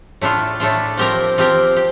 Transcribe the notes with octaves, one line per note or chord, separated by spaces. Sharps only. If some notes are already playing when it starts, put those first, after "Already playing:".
A2 A3 D4 F4
A2 A3 D4 F4
F3 C4 G4 A#4
F3 C4 G4 A#4
G4